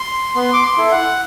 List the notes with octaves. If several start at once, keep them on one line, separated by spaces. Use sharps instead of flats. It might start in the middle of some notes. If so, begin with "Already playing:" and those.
Already playing: C6
B3 C6
D6
C6
E4 A4
F#5